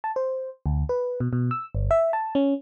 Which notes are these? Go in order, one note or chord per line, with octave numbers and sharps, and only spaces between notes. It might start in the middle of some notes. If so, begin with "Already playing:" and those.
A5
C5
D2
B4
B2
B2
E6
G1
E5
A5
C#4